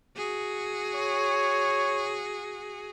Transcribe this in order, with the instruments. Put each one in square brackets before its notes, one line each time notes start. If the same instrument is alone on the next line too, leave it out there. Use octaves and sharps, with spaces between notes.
[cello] F#4 G#4
[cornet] C#5